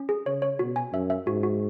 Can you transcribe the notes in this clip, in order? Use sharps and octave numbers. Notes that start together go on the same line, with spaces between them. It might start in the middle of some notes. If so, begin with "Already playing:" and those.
Already playing: C#4
G#4
C#3 C#5
C#5
B2 F#4
G#5
F#2 E5
E5
G#2 F#4
F#4